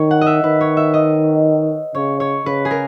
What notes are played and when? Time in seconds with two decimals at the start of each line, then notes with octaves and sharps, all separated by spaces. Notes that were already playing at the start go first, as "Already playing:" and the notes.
Already playing: D#3 C#5
0.11 F#5
0.21 D#5
0.27 E5
0.43 D#3 B4
0.61 C#5
0.77 E5
0.94 D#5
1.95 C#3 C#5
2.20 C#5
2.46 C#3 B4
2.65 G#4
2.71 A#4